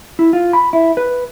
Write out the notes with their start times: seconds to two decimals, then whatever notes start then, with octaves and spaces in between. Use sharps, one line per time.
0.19 E4
0.33 F4
0.53 B5
0.73 E4
0.97 B4